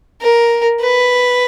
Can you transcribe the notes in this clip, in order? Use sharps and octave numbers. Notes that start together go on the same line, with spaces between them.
A#4
B4